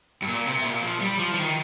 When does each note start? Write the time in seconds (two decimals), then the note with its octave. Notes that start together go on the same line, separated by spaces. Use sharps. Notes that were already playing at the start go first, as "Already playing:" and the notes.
0.22 G2
0.27 A#2
0.46 C3
0.64 A#2
0.82 F3
1.01 G3
1.19 F3
1.34 F3
1.38 D#3